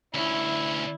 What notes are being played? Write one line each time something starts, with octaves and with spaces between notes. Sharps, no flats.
D2 C#4 E4